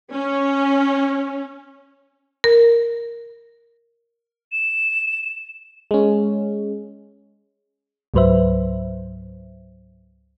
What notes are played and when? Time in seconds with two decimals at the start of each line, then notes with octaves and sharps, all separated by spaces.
0.12 C#4
2.44 A#4
4.52 E7
5.91 G#3 C#4
8.14 C#2 G#2 F#3 B4 C5 E5